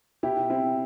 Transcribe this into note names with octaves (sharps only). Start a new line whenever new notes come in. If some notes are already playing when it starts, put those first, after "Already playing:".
B2 E4 G4
C4 E4